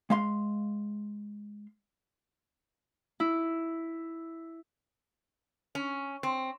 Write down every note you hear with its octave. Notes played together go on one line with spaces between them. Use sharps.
G#3 F5 C6
E4
C#4
C4